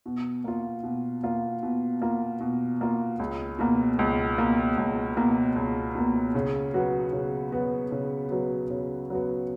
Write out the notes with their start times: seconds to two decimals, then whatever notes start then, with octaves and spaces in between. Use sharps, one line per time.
0.06 B2
0.44 A#3 F4
0.83 B2
1.23 A#3 F4
1.63 B2
2.02 A#3 F4
2.40 B2
2.81 A#3 F4
3.19 C#2
3.59 B2 A#3
3.99 C#2
4.38 B2 A#3
4.78 C#2
5.17 B2 A#3
5.56 C#2
5.95 B2 A#3
6.35 C#3
6.74 F#3 B3 F#4
7.13 C#3
7.52 F#3 B3 F#4
7.92 C#3
8.31 F#3 B3 F#4
8.70 C#3
9.10 F#3 B3 F#4